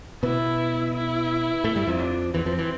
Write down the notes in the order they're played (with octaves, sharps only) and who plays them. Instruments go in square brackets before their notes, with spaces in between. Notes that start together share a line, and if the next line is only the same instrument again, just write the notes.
[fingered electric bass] B2 B3 [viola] E4
[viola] E4
[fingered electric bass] A2 A3
G2 G3
F2 F3
[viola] D4
[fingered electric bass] E2 E3 [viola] C4
[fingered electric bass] F2 F3
E3